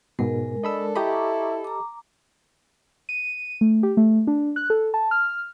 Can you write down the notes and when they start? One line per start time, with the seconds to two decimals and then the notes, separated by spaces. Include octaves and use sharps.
0.19 G#2 B2 G#3 A#4
0.64 D4 A4 D#5 B5 E6
0.96 E4 G4 D#5 A#5 B5 C#6 D6
1.64 A#5 D6
3.09 D#7
3.61 A3
3.83 G4
3.97 A3
4.27 D4
4.56 F#6
4.70 A4
4.94 A5
5.11 F6